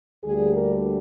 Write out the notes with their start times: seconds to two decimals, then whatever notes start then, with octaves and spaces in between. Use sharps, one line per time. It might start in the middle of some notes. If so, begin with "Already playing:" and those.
0.24 D2 D3 G3 A#3 G#4
0.52 A#4